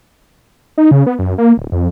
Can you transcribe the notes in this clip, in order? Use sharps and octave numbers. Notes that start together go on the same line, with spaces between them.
D#4
C#3
B3
F#2
A#3
D1
F2